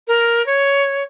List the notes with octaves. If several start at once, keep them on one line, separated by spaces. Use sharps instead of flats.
A#4
C#5